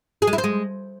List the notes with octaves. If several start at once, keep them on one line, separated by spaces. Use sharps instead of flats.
G#4
G#3
E4
C5
G#3